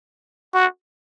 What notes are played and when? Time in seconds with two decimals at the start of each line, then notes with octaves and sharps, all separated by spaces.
0.54 F#4